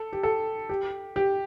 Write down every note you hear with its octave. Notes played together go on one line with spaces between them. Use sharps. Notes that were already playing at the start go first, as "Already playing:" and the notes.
Already playing: A4
G4
A4
G4
G4